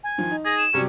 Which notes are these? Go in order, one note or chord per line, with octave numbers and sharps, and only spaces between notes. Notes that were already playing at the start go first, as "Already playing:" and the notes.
G#5
D#3 F3
D#4
G#4 A#6
E7
C3 F#3 G3 C#4